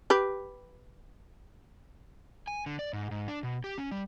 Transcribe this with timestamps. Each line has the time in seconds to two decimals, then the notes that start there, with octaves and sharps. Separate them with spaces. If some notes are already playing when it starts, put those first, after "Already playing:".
0.10 G4 B4
2.48 G#5
2.66 D3
2.79 D5
2.93 G#2
3.11 G#2
3.28 D4
3.43 B2
3.64 G4
3.78 C#4
3.91 G3